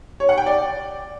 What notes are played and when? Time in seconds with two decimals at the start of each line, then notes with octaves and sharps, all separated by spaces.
0.20 C#5
0.29 F#5
0.38 G5
0.46 D5